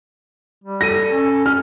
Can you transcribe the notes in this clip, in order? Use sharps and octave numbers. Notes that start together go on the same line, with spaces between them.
G3
A4 A#6 D#7
C#4
F6